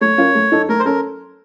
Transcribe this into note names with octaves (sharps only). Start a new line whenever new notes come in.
A3 C#5
C#4 F4 A#4
A3
D#4 A4
A3 A#4
C5
C#4 A4 A#4